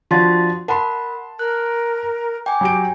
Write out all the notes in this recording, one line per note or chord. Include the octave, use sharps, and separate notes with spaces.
F3 D4 F4 F#4 C6 A6
A#4 F#5 A5 B5 C6
A#4 F#6
G5 G#5 D6
F#3 G4 D7